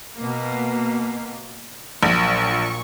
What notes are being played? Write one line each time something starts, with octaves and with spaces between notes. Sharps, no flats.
B2 A#3
A#1 A#2 F#3 C#6